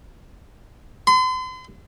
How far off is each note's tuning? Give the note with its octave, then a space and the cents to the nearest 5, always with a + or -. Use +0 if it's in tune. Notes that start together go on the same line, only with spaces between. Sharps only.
C6 -40